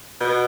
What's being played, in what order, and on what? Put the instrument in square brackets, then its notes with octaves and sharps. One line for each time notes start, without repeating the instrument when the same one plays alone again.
[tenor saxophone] B2